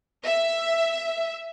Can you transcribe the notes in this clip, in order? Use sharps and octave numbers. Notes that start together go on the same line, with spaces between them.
E5